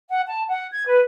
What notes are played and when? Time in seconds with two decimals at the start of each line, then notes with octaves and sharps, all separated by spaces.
0.09 F#5
0.27 A5
0.47 F#5
0.72 G#6
0.86 B4